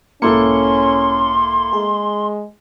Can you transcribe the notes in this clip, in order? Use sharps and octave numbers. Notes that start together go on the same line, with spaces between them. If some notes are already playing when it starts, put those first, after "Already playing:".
B1 G#2 A#3 C#4 E4 A4 C6 C#7
G#3 G#4